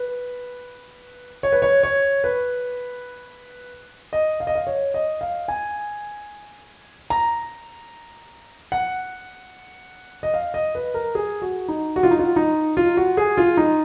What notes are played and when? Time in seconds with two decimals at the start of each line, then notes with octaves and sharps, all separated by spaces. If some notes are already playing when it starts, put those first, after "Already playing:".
Already playing: B4
1.43 C#5
1.52 B4
1.62 C#5
1.83 C#5
2.24 B4
4.13 D#5
4.40 F5
4.47 D#5
4.55 F5
4.67 C#5
4.94 D#5
5.21 F5
5.48 G#5
7.10 A#5
8.72 F#5
10.23 D#5
10.34 F5
10.54 D#5
10.75 B4
10.94 A#4
11.15 G#4
11.42 F#4
11.68 D#4
11.96 F#4
12.03 F4
12.11 D#4
12.19 F4
12.36 D#4
12.77 F4
12.97 F#4
13.17 G#4
13.37 F4
13.57 D#4